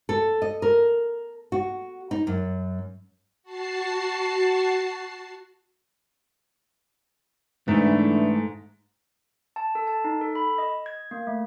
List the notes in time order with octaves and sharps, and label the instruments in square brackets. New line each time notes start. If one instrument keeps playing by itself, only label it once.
[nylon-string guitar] A4
D#5
A#4
F#4
D#4
F#2
[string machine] F#4 A5 C7
[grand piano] G#2 [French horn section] D3 E3 [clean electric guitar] A3
[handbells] A5
A4
A5
D#4
A4
B5
D#5
G#6
A#3
A3